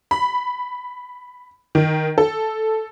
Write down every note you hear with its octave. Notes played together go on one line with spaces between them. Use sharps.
B5
D#3
A4